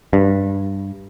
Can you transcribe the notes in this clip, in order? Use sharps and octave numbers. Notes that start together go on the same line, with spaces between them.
G2